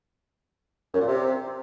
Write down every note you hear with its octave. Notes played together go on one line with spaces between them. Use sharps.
F#2
A#2
C3